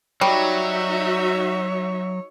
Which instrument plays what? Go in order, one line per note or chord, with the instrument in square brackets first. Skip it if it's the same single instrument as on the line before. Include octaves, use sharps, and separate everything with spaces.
[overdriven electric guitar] F#3 [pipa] G3 [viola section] D#4 F#4 E5 [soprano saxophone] C#5